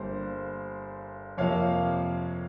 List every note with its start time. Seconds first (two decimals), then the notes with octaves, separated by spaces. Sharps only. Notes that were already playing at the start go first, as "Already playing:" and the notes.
Already playing: G1 G2 G3 A#3 C5
1.37 F2 C3 F3 A#3 C#5 F5